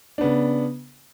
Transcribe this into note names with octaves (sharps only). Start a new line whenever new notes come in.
C#3 B3 D4